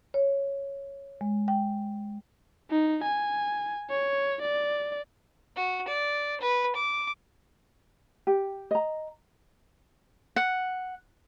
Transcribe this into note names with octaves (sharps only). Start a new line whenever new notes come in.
C#5
G#3
G5
D#4
G#5
C#5
D5
F#4
D5
B4
D6
G4
D#5 A#5
F#5